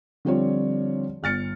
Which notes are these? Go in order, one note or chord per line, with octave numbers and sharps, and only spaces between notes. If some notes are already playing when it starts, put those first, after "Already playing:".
D3 F3 G3 C4 F4 C#5
G1 F6 A6 C#7